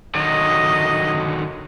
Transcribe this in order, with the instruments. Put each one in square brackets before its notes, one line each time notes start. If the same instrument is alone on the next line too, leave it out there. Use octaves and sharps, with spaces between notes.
[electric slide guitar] D3 D#3 F#3 [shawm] D#5